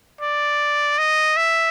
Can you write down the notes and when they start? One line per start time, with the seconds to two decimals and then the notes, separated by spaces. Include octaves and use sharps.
0.21 D5
0.98 D#5
1.36 E5